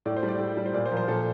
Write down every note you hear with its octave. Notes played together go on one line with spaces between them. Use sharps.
A2 D5
C5
G3
D5
A2
G3
C5
A#2 D5
C5
F3 A#4
C5
A#2 A4